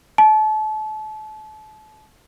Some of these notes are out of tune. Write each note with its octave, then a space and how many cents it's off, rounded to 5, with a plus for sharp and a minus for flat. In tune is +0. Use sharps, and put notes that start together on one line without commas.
A5 -35